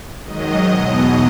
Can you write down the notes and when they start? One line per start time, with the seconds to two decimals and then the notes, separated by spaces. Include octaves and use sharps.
0.24 G#2 D#3 F#3 D#5
0.69 E2 B2 F#3